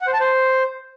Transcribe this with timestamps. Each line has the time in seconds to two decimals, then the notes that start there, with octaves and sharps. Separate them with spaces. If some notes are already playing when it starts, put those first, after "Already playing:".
0.01 F#5
0.07 C5
0.13 A5
0.20 C5